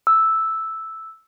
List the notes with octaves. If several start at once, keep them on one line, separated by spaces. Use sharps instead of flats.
E6